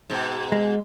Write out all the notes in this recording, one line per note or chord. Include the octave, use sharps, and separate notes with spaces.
G#2 B2
G#3